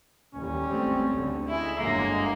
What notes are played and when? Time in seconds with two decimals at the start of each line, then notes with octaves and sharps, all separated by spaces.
0.35 A1 D#2 G3 C#4
0.68 G#1 A3 C4
1.11 D2 D3
1.49 G#3 E4
1.79 G1 D3 F#3 G#3 A#3